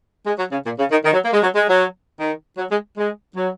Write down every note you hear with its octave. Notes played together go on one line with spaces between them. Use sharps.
G#3
F#3
C#3
A#2
C#3
D#3
D#3
F#3
A#3
G#3
F#3
G#3
F#3
D#3
F#3
G#3
G#3
F#3